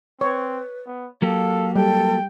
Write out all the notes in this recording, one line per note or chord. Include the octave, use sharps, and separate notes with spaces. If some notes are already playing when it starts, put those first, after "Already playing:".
C4 B4 C#5
B3
F#3 A#3 G4 A4 F5
G3 A4 G5